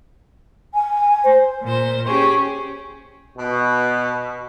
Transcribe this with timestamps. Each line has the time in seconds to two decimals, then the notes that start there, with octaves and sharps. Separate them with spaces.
0.74 G#5
1.24 C5
1.63 A#2 C5
2.07 C#4 G4 G#4 C#6
3.37 B2